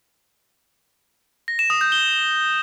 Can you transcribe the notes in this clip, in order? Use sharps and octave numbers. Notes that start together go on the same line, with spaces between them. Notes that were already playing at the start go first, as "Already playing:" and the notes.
A#6
E7
D#6
G6
G7